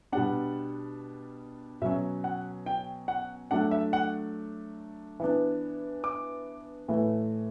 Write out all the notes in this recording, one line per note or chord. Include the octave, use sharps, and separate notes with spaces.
B2 G3 D4 F#5
B2 F#3 C#4 E5
F#5
G5
F#5
F#3 A3 D4 F#5
E5
F#5
E3 B3 D4
D6
A2 E3 A3